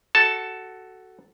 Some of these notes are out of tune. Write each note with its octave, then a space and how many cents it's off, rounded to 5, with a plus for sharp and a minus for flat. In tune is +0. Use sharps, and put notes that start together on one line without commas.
F#4 +10 A4 +0 A5 +0